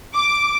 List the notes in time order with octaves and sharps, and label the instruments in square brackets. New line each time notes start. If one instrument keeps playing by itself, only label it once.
[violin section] D6